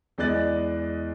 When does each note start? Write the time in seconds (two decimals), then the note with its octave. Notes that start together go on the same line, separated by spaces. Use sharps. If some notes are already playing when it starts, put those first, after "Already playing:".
0.18 E2 G#3 D5 D#5 F#6 A6